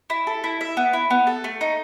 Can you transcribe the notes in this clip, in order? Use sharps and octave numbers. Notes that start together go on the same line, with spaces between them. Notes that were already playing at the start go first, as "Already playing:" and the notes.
E4
A4
E4
E5
B3
E4
B3
A4
A3
D#4